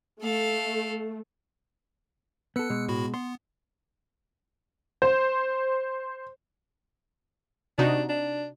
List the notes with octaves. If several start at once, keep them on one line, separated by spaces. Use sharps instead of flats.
A3 A4 F5
B3 A4 E6 F#6 C#7
B2 G#3
A2 F#4 B5
B3 C6
C5
C3 D4 D#4 F#4
D4